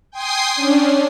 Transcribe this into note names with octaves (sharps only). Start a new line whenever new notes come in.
G5 G#5 C6 D#6 C7
C#4 D4